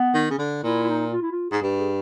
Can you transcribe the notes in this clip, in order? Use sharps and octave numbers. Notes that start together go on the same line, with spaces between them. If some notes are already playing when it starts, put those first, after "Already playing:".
Already playing: B3
D#3
C#3
D3
A#2 E4
E4
D#4
F4
E4
F4
G#2 G#4
G2 G4
G#4